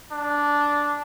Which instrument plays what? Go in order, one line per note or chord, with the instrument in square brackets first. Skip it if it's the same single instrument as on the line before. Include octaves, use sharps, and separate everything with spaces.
[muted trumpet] D4